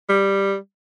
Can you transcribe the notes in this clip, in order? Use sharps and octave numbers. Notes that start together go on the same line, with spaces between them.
G3